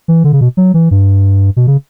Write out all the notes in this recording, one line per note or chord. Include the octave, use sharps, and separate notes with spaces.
E3
D3
C#3
B2
F#3
E3
G2
B2
C#3